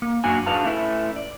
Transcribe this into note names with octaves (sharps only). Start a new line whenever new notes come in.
A#3
F#2 F#3 A#3 D4 F#4 G#5
D4 F#4 G#4 B4 F5 A5
A3 C#4 E4 B4 E5
D5